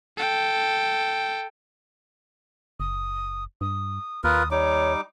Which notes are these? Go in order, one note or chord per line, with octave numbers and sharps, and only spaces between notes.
A4 G5
F#1 D#6
G2 D#6
D#2 F4 A#4 B4 D#6
G3 D#4 C#5 D6